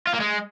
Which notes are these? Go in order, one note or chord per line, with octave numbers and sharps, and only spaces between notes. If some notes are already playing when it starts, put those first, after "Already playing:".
F4
A#3
G#3